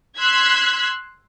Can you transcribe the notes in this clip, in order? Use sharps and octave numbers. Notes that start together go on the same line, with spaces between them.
C6 E6 F#6 G#6 B6